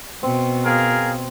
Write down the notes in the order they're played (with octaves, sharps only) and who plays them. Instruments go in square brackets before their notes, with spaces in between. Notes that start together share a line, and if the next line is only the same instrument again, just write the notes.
[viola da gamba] B2 [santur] C4
[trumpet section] G#4 A#4 F5